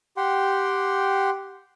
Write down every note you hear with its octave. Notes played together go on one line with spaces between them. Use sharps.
G4 F#5 G5 C6